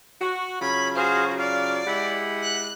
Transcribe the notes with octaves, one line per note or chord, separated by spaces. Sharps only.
F#4
C#3 F#3 F4 C#5 B5
F#4 G#4 C5 F5
D5 F5
G#3 E4 G4 F#5 B5
F#6